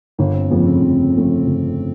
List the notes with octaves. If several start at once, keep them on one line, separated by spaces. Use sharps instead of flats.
G1 A#3
C4
F2 C#3 F3 A3 B3
C4
G1
F2 C#3 F3 A3
G1